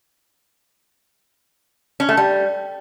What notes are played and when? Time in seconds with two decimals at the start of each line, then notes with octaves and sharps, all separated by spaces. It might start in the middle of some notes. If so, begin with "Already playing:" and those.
2.00 C#4
2.09 A3
2.17 G3